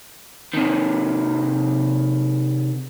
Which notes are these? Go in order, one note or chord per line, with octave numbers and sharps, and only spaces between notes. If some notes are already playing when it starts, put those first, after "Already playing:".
C3 D#3